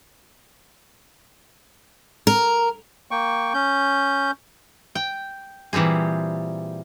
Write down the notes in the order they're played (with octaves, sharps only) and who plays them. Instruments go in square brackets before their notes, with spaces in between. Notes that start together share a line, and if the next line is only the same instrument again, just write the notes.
[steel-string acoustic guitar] A#4
[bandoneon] A#3 G5 C#6
C#4 G6
[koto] G5
A#2 E3 G3 C4 G#4